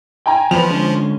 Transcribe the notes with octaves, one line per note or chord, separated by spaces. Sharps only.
G5 G#5 A#5
E2 F3 B4 F7
D3 G#3 C#4